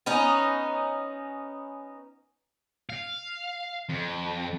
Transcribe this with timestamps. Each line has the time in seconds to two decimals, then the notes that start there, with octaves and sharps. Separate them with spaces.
0.06 B3 C#4 D#4
2.90 F5
3.89 F2